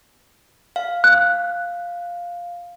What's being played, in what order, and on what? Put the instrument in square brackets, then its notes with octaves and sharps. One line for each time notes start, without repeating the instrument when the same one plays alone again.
[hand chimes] F5
[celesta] F#6